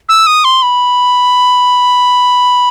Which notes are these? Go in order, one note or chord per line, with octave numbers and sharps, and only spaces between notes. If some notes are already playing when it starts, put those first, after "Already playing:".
E6
D#6
C6
B5